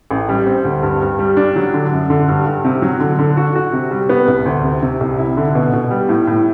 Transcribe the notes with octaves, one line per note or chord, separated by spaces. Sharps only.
A1
G3
C4
D2
G2
G2
G3
D4
F#3
D3
F#2
D3
G2
G2
C3
F#3
D3
D3
F#4
F#4
C3
G3
B3
C2
D2
C3
C3
C2
E4
D3
B2
B2
G3
A2
A2